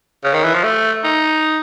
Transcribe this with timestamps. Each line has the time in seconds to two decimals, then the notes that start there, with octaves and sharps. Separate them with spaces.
0.24 C#3
0.34 D#3
0.44 E3
0.54 F3
0.64 A3
1.04 D#4